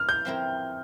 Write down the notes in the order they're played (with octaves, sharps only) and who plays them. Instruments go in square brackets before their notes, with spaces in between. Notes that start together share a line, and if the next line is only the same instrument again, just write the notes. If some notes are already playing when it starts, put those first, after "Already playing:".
Already playing: [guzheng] F2 [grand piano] F6
[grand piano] G6
[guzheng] F3 C4 E4 A#4